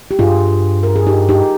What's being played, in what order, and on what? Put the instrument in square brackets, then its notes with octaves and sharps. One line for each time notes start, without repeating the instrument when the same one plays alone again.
[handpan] G4
[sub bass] G2 [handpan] F4 G#4
[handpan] A#4
G#4
D#4 G4
D#4 G4